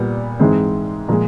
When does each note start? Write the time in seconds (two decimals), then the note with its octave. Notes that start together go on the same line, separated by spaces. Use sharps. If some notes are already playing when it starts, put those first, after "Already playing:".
Already playing: A#2 G3 B3
0.39 G#2 E3 G#3 C4
1.09 A#2 F3 G#3